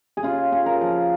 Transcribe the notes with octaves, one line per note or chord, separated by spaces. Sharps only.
G#4
C#3 F4
C#3
A#4
F3